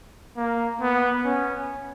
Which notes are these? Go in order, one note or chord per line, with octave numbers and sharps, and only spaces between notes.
A#3
B3
C#4